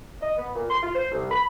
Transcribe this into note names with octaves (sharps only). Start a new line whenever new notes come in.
D#5
B3
A#2
C6
F4
C5
C2
B5